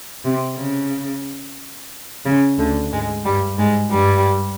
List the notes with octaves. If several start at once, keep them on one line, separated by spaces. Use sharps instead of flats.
C3
C#3
C#3
D2 D3
G#2 G#3
G2 G3
G#2 G#3
G2 G3